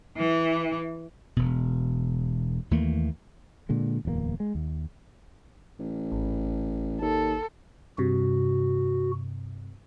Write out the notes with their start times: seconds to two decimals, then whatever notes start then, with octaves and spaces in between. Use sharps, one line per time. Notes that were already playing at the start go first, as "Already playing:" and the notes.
0.17 E3
1.36 E1 B2
2.71 D#2 E3 A3 A#3
3.69 A#2 D3 G#3
4.05 D1 E2 F3 A#3
4.40 G#3
4.55 D#2
5.79 A1
6.12 G#1
7.01 D#2 A4
7.98 G2 C3 F#4